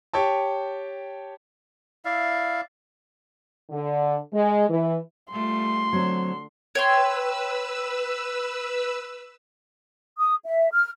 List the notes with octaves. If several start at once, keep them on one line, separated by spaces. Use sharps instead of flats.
G4 C#5 G5 A5
E4 D5 E5 F5
D3
G#3
E3
G3 A3 F4 C6
D3 F#3 C4
B4 C#5 G5 C6 E6
D#6
E5
F6